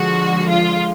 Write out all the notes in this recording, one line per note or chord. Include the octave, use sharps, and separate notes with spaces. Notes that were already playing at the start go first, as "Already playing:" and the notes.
Already playing: D3 F3 G#3 F#4
F4